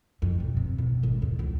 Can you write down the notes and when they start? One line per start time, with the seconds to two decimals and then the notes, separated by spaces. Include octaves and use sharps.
0.22 F2
0.40 B2
0.57 C3
0.78 B2
1.03 G#1
1.22 E2
1.39 C#2